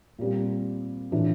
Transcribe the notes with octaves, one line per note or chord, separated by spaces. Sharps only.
A#2 G3 C4
A2 E3 A3 D4 F4